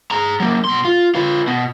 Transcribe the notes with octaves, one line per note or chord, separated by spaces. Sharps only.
G#4 A#5
F#3 A#3
B2 C6
F4
F4 B4
B2